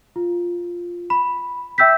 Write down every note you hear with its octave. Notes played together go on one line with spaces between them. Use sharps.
F4
B5
E5 G5 E6 G6 B6